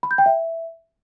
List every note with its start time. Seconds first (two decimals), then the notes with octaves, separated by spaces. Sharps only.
0.03 B5
0.11 G6
0.18 G5
0.26 E5